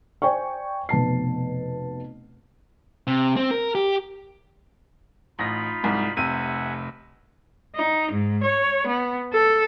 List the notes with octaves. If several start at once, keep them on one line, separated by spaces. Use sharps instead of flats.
C5 D5 G5 G#5 C#6
F1 B2 A5 C7
C3
C4
A#4
G4
A1 D#4 F4 B5 A#6
C2 G#2
F1 C3 E5 F#5 G#5 D#7
D#4
G#2
C#5
B3
A4